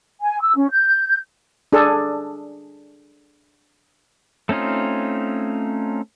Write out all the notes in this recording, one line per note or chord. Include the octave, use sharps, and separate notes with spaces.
G#5
E6
C#4
G6
D4 G#4 A4
A3 C4 C#4 D#4 F4